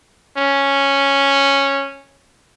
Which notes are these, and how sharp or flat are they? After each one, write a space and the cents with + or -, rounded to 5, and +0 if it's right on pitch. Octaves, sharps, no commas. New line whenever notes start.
C#4 -5